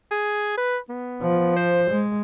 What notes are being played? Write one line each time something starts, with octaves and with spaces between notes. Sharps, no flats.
G#4
B4
B3
F3
C5
G#3